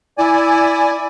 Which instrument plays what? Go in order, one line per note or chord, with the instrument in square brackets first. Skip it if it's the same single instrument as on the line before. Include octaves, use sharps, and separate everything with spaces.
[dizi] E4 [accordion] D5 G#5